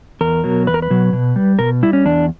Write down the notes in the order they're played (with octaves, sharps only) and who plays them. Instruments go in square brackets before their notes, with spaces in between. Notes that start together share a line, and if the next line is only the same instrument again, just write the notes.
[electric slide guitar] E2 A#4
B2 F#3
E2 B4
A#4
B4
B2 F#3
B2
G3
B2 A#4
G3 E4
C#4
E2 D4